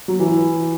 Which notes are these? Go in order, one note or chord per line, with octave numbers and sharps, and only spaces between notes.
F#3
E3